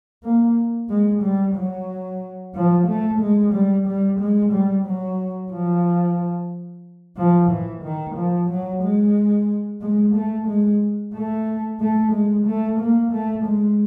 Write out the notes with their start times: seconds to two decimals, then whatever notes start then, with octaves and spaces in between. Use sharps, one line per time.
0.23 A#3
0.89 G#3
1.22 G3
1.55 F#3
2.54 F3
2.88 A3
3.21 G#3
3.53 G3
3.87 G3
4.20 G#3
4.53 G3
4.86 F#3
5.52 F3
7.17 F3
7.50 E3
7.83 D#3
8.16 F3
8.50 F#3
8.82 G#3
9.81 G#3
10.15 A3
10.48 G#3
11.14 A3
11.80 A3
12.12 G#3
12.46 A3
12.80 A#3
13.12 A3
13.45 G#3